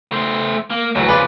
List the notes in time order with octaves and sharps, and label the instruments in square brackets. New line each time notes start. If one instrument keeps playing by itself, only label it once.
[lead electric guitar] A3 C5
A#3
[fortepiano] D2 E3 [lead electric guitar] F#3
[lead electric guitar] C#3 F3 [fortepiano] B4 D5